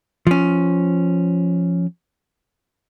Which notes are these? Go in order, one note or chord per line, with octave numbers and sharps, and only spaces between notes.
F3 C#4